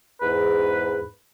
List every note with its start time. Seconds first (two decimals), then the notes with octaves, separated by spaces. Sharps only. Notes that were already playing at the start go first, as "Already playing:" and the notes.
0.21 E2 G#2 B4